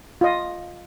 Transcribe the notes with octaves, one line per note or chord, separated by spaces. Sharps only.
F4 D#5